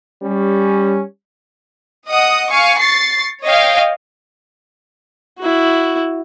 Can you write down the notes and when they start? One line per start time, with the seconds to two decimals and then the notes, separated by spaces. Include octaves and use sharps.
0.23 G3 C#4
2.08 D#5 F#5 D#6
2.50 F5 G#5 C#6
2.80 C#6 A6 C7
3.44 C#5 D#5 F5 G5
5.38 E4 F#4